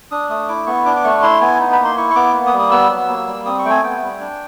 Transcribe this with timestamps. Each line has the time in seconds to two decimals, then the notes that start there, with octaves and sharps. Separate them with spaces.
0.11 D4 D#6
0.29 A3 D#6
0.48 E4 D6
0.67 B3 C#6
0.86 D4 D6
0.96 D6
1.04 A3 C#6
1.23 E4 C6
1.41 B3 G#5
1.60 D#4
1.73 B5
1.78 A#3
1.85 C6
1.97 E4 C#6
2.10 C#6
2.16 B3 D6
2.34 A#3
2.47 D#6
2.53 G3
2.59 D#6
2.71 B3 E6
2.90 F#3
3.08 A#3
3.28 G3
3.46 C4 D#6
3.59 C#6
3.65 A3 G5
3.70 G#5
3.83 B3 G5
4.02 G3
4.20 D4